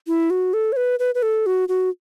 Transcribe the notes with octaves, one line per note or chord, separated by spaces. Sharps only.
E4
F#4
A4
C#5
B4
B4
B4
A4
F#4
F#4